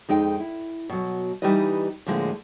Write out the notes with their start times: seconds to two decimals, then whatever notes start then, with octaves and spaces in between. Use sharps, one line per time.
0.09 F2 G#3 D#4 G5
0.40 E4
0.89 B2 F#3
1.42 E3 G3 D#4 E4 B4 D#5
2.07 A2 D3 F3 G#3 A#3